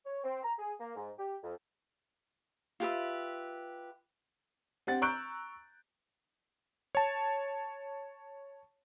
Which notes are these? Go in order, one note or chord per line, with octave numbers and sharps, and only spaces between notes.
C#5
C4
A#5
G#4
A#3
G#2
G4
F2
F4 G4 B4 E5
C4 G4 F#5 A6
A#5 C#6 E6 F#6 G6 D7
C#5 A5